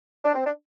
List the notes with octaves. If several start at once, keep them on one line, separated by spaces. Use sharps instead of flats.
D4
C4
D4